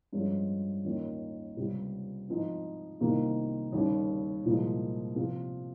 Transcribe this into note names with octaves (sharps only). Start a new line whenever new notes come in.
G2 F3 G#3 C#4 F4
D#2 D#3 A#3 C#4 F4
C#2 C3 G3
G#2 F3 C4 D#4
C2 C3 D#3 A#3 F4
D#2 C#3 G3 C4
C2 A#2 F3 G#3
C3 F3 C4 F4